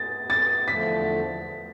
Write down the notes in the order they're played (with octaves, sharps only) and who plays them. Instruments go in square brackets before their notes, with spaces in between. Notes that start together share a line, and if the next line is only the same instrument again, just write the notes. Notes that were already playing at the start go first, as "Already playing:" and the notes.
Already playing: [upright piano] A6
A6
[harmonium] E2 D3 F3 A3 [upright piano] B6